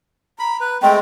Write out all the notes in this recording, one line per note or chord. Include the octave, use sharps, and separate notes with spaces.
A#5 B5
B4
G#3 A3 C4 G5